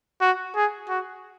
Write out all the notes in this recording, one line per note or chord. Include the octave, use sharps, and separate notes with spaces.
F#4
G#4
F#4